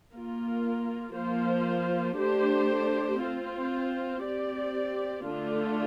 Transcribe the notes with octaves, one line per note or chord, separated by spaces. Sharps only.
A#3 F4 A#4
F3 A#3 F4 C5
A3 D4 G4 C5
C4 F4 C5
C4 G4 D5
D3 A3 D4 F4